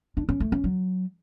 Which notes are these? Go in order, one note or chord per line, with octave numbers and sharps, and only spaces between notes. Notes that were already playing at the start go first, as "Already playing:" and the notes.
D4
C#4
A3
C#4
F#3